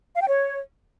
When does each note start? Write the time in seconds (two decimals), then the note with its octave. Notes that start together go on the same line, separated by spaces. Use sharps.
0.14 F5
0.21 G5
0.27 C#5